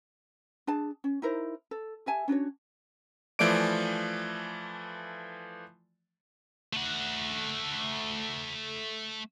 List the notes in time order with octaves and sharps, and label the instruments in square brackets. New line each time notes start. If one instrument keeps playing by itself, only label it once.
[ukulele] D4 G#4 A5
C#4
D#4 E4 A#4 C5
A4
G4 E5 G#5 A5
C#4 D4 F#4 C#5
[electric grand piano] E3 F3 A3 D5 D6 D7
[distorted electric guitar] A3 F#5